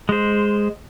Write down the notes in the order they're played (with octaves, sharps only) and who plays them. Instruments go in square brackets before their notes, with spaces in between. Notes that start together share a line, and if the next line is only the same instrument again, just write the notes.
[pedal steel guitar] G#3 C5